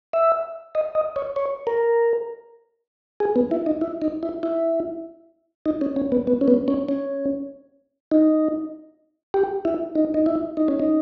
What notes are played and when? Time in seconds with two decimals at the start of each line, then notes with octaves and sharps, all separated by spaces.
0.13 E5
0.75 D#5
0.95 D#5
1.16 C#5
1.36 C#5
1.67 A#4
3.20 G#4
3.36 B3
3.51 E4
3.66 D#4
3.81 E4
4.02 D#4
4.23 E4
4.43 E4
5.66 D#4
5.81 C#4
5.96 C#4
6.12 B3
6.27 B3
6.41 C#4
6.48 B3
6.68 C#4
6.89 C#4
8.11 D#4
9.34 G4
9.65 E4
9.95 D#4
10.14 D#4
10.26 E4
10.57 D#4
10.68 C#4
10.80 D#4